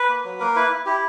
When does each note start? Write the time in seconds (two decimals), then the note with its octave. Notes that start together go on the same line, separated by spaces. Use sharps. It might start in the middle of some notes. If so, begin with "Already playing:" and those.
Already playing: B4
0.09 A#3
0.24 F#3
0.40 A#3 A#4
0.56 E4 B4
0.71 E4
0.86 E4 G4